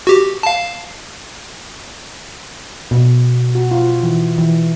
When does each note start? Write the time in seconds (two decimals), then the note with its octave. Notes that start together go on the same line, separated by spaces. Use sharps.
0.07 F#4 G4
0.43 F5 A5
2.91 B2
3.55 F#4
3.71 F4
4.03 E3
4.38 E3